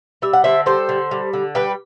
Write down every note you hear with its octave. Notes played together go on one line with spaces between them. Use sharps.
G3 E5
F#5
D3 C5 E5
G3 A4 C5
D3
G3
D3
G3 G4 B4